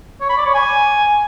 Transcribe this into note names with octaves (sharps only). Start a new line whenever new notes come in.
C#5
B5
D5
C#5
G#5